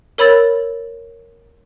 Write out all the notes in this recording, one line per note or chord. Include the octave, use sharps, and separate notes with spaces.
A#4 C#5 B5 E6 A6